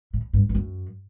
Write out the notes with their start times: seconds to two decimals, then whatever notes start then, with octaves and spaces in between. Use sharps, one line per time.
0.13 A2
0.33 G2
0.49 G2
0.55 F#2